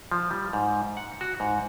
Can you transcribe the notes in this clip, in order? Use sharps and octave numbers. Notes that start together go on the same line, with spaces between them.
F3
G3
G#2
F#5
F#4
G#2